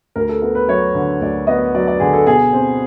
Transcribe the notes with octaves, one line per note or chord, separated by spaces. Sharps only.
D2 A#4
A4
B3 A4
B4
F#3 C#5
D3
D2 D5
B3 D#5
F#3 D5
D5
D3 G#4
A4
B2 G#4
C4